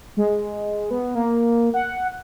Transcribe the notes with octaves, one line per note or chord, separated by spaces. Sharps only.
G#3
B3
A#3
F#5